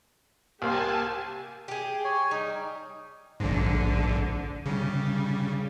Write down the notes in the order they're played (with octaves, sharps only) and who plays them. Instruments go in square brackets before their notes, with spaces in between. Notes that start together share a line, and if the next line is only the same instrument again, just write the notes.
[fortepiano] C2 A#3 C5 [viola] G4 [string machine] G#5 A5
[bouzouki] G4 G#4
[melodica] C#5 G#5
[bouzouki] G3 [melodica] D#4
[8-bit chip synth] A#1 G#2 [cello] D3
[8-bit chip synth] C#3 [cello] G3